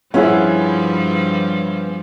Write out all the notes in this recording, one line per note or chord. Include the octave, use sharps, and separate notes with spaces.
G2 F3 G3 B3 C#4 E4 G#4